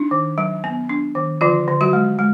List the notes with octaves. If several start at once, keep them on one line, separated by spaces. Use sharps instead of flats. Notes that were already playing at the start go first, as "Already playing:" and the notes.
Already playing: D4 D#4
D#3
F#3
B3
D4
D#3
D3 F3 F4
D3
F#3 F#4
G#3
G#3